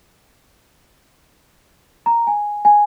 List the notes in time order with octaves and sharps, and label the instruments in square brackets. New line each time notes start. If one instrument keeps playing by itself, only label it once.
[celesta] A#5
G#5
G#5